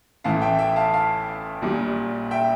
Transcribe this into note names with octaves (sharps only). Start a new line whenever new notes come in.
A1 A2 E3 A3 F5 A5
E5 G5
E5 G5
F5 A5
F5
A#1 A#2 G3
E5 G5